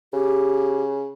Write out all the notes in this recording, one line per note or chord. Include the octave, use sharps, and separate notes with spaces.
C#3 G4